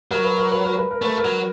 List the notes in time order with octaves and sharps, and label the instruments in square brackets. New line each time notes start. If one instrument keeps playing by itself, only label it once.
[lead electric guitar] F#3 [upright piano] A#4
[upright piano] B4
A#4
B4
A#4
B4
A#4
[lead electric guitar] A3 [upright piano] B4
[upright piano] A#4
[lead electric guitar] F#3